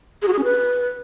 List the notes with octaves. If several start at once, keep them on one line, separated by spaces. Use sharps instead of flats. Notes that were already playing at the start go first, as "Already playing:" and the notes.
G#4
F#4
G#4
C#4
B4